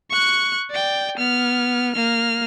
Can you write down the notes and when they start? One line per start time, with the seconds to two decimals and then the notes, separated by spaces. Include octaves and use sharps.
0.10 C#6 F#6
0.71 D5 G5
1.18 B3 F6
1.94 A#3 F6